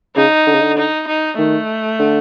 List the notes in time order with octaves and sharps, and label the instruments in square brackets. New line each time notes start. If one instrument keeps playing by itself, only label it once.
[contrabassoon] C#3 [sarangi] D#4
[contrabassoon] D3
C#3
D3
[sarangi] D#4
D#4
[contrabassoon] D#3 [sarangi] A3
[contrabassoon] D3